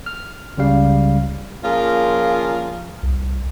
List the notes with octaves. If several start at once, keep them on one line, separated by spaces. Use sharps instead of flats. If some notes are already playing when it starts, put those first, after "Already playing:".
F6
C#2 C#3 G3 F5
A#2 F3 C#4 F4 G#4 A#4
C2